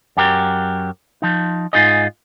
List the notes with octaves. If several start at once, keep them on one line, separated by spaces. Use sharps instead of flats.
F#2 F#3 G4 A#4
F3 D#4
G#2 C3 D#4 F4 G#4 D#5